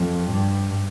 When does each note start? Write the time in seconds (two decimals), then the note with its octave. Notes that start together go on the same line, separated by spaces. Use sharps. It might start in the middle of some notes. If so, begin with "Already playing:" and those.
Already playing: F2
0.30 G2